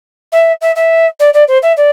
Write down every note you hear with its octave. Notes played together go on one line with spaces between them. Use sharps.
E5
E5
E5
D5
D5
C5
E5
D5